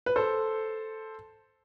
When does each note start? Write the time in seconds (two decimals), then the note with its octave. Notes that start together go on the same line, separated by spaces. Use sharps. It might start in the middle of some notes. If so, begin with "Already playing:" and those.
0.06 B4
0.16 A4 C5